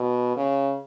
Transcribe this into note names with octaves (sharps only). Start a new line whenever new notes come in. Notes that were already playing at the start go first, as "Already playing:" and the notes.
Already playing: B2
C#3